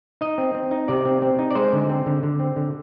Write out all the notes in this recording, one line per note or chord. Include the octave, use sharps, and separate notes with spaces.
D#4 D#5
C4
C4
D#4
C3 D5
C4
C4
D#4
D5
G#3 C5
D3
C4
D3
D3
C4
D3